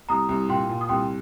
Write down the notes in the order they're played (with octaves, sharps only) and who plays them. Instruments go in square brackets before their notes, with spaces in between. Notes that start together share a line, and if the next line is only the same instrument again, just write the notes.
[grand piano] C2 [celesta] A#5 D#6
[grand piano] C2
[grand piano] A#2 [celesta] G5 C6
[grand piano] A#2
[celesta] D#6
[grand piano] C2 [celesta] G5 C6